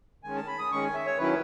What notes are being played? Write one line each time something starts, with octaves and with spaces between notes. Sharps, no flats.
D#3 G#3 C#4 G#5
A5
B5
D#6
D#3 G#3 C#4 C#6
G#5
E5
C#5
D#3 F#3 C#4 E4 B4